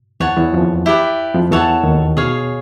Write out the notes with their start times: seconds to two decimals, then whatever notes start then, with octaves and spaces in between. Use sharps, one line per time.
0.20 E2 E3 C#5 F#5 A5
0.37 E2 E3
0.53 F2 F3
0.86 E4 G4 B4 D5
1.34 F2 F3
1.51 E2 E3 A4 C#5 F#5 A5
1.84 D#2 D#3
2.17 B2 G#4 C#5 F5